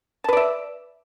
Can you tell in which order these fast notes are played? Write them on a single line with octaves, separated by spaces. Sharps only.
A5 B4 D5 E5